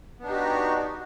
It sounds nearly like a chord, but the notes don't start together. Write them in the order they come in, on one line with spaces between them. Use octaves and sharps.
B3 D4 D#4 G4 F#4